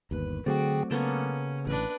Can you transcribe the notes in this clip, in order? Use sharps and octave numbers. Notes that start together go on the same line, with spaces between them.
G1 D#2 B4
D3 F#3 A3 C4 F#4 G#4 D5 G5
C#3 A#3 B3 C#4 A4
A1 D4 B4